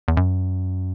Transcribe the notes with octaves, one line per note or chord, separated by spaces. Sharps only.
E2
F#2